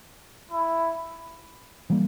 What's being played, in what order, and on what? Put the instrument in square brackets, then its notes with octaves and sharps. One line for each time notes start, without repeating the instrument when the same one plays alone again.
[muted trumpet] E4
[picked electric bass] E3 G3 A#3